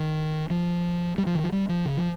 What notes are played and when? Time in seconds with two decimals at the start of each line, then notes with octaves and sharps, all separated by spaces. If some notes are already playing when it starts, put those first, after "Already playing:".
Already playing: D#3
0.50 F3
1.18 G3
1.26 F3
1.35 D#3
1.44 F3
1.52 G3
1.69 F3
1.85 C#3
1.97 F3